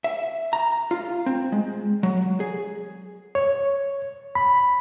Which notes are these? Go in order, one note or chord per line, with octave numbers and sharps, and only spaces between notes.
E5
A#5
F4
C4
G#3
F#3
G#4
C#5
B5